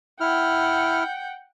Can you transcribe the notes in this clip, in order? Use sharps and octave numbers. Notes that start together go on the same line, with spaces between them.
E4 F#5 G5 F6